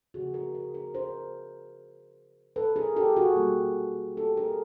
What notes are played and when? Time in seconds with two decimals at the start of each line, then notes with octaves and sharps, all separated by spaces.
0.14 C#3 F3 A#3 F#4 G#4
0.34 G#4 A#4
0.55 G#4 A#4
0.74 G#4 A#4
0.94 A#4 C5
2.56 A4 B4
2.76 G#4 A#4
2.96 G4 A4
3.17 F#4 G#4
3.36 B2 G3 A#3
4.17 G4 A4
4.37 G#4 A#4